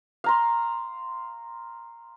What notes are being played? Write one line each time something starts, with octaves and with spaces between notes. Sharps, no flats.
F5 A#5 C6